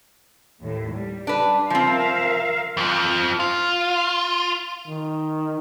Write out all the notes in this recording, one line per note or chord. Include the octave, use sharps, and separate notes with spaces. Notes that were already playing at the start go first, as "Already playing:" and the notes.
D#2 A2
G3
D4 B4
F3 C4 A#4 E5 F5
F2 F3
F4
D#3